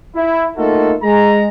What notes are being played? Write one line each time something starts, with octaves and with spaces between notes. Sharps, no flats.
E4
A3 A#3 D#4 F4 F#4 A4
G#3 A#5